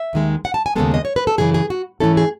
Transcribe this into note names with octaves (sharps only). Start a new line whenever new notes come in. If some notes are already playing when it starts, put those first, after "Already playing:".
Already playing: E5
D#2 D#3 G#3
F#5
A5
G#5
D#2 C#3 E3 G#3 B3 A4
D#5
C#5
B4
A4
F#2 C#3 E3 G#4
G#4
F#4
G#2 E3 A3 C#4 E4 A4
G#4